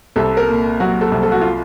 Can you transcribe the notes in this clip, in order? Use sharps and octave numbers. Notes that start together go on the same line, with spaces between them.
C2 A4
A#4
A#2
F#3 F#4
A4
C2
A4
F#4
F4